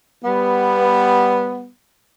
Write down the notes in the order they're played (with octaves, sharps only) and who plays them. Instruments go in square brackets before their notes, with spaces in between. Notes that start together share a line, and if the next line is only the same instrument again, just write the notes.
[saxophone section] G3 B3